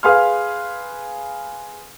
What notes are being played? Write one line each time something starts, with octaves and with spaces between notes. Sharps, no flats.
G#4 B4 F5 G#5 C6 F6